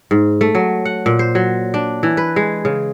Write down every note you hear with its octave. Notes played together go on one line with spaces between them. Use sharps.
G#2
A3
F#3
F#5
A#2
C5
F#3
D4
E3
B4
G#3
C#3